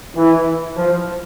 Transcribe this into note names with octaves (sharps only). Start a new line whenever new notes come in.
E3
F3